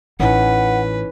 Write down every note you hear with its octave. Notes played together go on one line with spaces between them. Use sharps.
A1 E3 C#4 D#4 B4 F#5